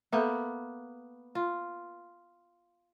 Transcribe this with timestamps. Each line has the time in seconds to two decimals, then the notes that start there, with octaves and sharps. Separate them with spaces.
0.12 A#3 B3 A4 A#4 E5
1.35 F4